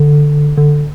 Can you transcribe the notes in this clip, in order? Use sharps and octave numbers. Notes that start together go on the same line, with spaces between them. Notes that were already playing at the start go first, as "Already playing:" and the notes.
Already playing: D3
D3